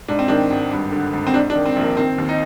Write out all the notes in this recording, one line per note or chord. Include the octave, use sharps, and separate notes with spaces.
G#2 D4
C4
D#3 D4
G#1
G2
D3
G#1
C4
G#2 D4
D4
D#3
C4
A#1 A#3
D#3 C4
D#2
D#4